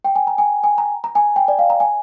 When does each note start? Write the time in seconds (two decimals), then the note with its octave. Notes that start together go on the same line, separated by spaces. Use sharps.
0.05 G5
0.16 G#5
0.27 A#5
0.38 G#5
0.64 G#5
0.78 A#5
1.04 A#5
1.15 G#5
1.36 G5
1.48 D5
1.59 F5
1.70 A#5
1.80 G#5